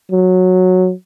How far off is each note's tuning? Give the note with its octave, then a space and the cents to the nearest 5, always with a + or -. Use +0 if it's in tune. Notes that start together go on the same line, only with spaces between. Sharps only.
F#3 -10